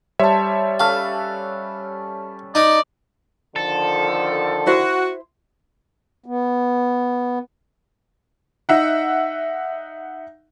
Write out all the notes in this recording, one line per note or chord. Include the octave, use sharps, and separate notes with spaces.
G3 C5 C#5 E5 A5
C#4 A4 B4 F5
D#4 D5
D3 D#3 F3 A4
E4 F#4 C5
B3
D#4 E5 F#5